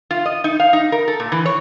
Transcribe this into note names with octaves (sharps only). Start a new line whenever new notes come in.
F4
D#5
D#4
F5
D#4
A#4
A4
A#2
E3
C#5